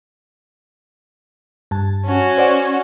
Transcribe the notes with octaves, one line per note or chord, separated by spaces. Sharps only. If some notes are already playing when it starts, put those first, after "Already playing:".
G2 A5
C#4 F#4
C5 D5 F#5